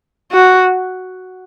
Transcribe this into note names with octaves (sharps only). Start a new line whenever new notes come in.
F#4